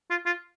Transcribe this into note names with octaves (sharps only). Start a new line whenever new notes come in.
F4
F4